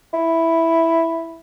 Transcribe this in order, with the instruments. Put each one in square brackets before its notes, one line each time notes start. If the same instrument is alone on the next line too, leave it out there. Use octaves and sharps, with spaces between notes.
[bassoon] E4